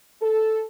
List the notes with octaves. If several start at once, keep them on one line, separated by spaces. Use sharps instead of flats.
A4